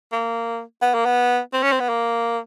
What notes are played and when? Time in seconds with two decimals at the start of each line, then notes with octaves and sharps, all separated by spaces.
0.12 A#3
0.82 B3
0.94 A#3
1.06 B3
1.53 C4
1.62 C#4
1.72 C4
1.80 B3
1.89 A#3